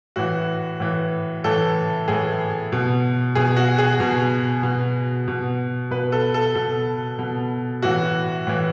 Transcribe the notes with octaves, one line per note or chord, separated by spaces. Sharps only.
A2 E3 F#4
A2 E3
A2 E3 A4
A2 E3 G#4
B2
B2 G#4
F#4
G#4
B2
B2
B2
B2 B4
A4
A4
B2 A4
B2
A2 E3 F#4
A2 E3